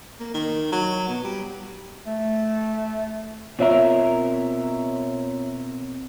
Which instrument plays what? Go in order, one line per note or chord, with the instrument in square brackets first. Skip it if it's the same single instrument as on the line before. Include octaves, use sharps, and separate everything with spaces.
[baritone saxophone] A#3
D#3
F#3
B2
G3
[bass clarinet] A3
[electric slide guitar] B2 C4 A#4 [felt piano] F4 C#5 E5